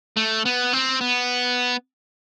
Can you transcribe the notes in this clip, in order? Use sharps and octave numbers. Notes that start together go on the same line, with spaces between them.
A3
B3
C4
B3